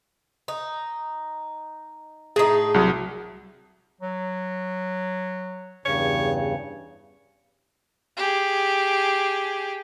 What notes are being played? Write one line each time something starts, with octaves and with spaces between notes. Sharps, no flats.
D#4
A2 D#4 G#4
C2 F#3
F#3
E2 G2 C#3 C#5
G4 G#4